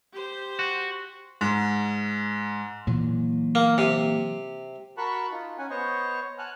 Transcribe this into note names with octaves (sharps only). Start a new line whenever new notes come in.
G4 C5
F#4
G#2
A#2 E3 F#3
A#3
C3
F#4 A#4 A5 B5 C#6 F#6
D#4 F4
C#4 F#5 G#5
B3 C5 C#5 D#5 C#6
F#5 G#5 A5 F6 F#6